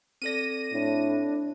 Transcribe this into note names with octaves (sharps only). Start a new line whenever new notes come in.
C4 A4 D5 A#6 D#7
A2 D4